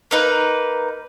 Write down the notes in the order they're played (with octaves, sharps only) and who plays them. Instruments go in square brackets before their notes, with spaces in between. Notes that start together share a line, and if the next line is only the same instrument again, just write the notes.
[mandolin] A#3 D#4 B4